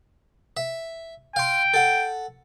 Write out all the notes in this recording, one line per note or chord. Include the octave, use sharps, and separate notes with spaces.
E5
F5 G5 C6
A4 F#5